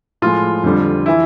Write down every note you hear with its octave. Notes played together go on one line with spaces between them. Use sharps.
A2 F3 G#3 F4
F2 D3 G3
E3 E4